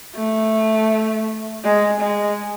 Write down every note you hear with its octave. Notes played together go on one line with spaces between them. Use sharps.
A3
G#3
G#3